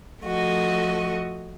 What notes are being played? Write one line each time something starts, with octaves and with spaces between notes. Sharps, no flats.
F3 A3 F#4 D#5